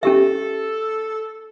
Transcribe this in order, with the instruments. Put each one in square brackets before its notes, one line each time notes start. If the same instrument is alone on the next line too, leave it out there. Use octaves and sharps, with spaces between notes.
[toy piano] C#4 G4 E5 [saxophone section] A4